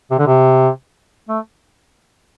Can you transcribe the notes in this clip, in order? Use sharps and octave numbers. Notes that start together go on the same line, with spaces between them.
C3
D3
C3
A3